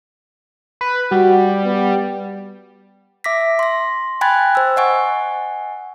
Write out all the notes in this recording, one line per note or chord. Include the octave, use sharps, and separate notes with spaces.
B4
G3 F#4
B3
E5 D6 A#6 B6
C6 A#6
G5 G#5 B5 F#6 G#6 A6
C5 E6
D#5 F#5 G#5 C#6